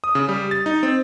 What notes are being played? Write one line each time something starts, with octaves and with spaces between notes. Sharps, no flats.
D#6
C#3
G3
A6
D#4
C4